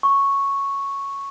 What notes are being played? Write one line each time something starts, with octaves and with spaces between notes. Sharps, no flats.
C#6